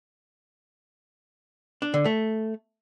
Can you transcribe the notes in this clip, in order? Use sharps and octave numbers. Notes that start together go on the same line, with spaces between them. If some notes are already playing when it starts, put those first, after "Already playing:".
D4
D3
A3